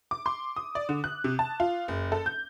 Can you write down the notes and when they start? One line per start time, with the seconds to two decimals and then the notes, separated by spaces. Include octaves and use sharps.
0.11 D6
0.26 C6
0.56 D#6
0.75 D5
0.89 D3
1.04 F#6
1.24 C3
1.39 A5
1.60 F4
1.88 F#1
2.12 A4
2.26 G6